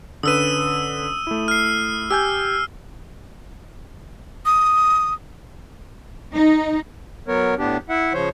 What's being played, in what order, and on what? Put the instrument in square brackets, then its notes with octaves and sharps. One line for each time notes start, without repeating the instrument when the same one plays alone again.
[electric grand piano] D3 C#4 B4 [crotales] D#6 E6 D#7
[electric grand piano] A3 E4
[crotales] F6 C7
[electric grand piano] G4 G#5 G6 [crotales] E6
[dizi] D#6
[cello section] D#4
[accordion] F#3 B3 A#4 C#5
A2 B3 D4 G4
E4 E5 F#5
C#3 F3 C5 C#5